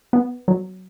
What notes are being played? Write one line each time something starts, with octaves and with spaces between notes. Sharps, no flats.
B3
F#3